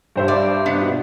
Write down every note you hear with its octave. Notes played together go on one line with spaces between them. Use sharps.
G2 C5 E5
D5
B3 D4
B2